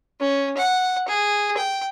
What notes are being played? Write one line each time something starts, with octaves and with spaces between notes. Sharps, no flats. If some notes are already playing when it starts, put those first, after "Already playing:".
C#4
F#5
G#4
G5